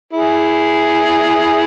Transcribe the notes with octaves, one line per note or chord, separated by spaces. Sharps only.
E4 G#4